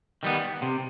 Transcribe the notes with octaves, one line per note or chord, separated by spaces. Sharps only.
D#3 G3 B3
C3